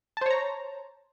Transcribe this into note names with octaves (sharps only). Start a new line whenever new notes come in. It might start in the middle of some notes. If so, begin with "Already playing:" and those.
C5 C#5 A5 A#5